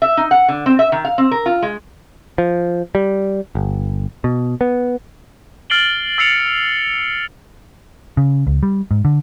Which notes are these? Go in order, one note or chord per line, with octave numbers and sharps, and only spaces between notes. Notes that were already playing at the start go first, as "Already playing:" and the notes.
E5
D#4
F#5
D3
C4
E5
D#3
F5
C4
A#4
F4
G#3
F3
G3
G1
B2
B3
F6 A6 C7 D7 F#7 G7
E6 A6 C7 C#7 F7
C#3
C#2
G3
G#2
D3